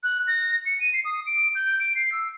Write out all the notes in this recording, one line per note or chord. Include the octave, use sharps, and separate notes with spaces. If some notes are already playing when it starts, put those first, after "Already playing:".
F#6
A#6
C#7
D#7
C7
D#6
D7
G6
D7
C7
E6